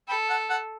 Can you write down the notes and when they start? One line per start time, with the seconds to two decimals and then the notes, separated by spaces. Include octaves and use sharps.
0.08 A4 G5 B5
0.30 F#5 A5
0.50 F#5 A5